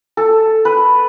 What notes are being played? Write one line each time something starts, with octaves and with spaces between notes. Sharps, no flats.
A4
B4